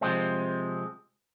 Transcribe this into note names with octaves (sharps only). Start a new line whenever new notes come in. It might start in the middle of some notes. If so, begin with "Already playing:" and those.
C3 F3 G#3 C4